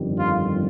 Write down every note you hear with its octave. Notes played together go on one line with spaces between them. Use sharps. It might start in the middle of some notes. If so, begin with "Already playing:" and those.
Already playing: G1 F2 D#3 G3
F4